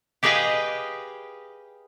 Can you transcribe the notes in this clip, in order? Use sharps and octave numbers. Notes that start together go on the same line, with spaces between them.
G4 G#4 B4 D#5 F5 G5